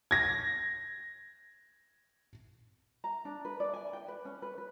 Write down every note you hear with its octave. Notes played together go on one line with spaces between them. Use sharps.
G#6 A#6
A#5
D4
B4
D5
G#5
G5
B4
C#4
B4
B4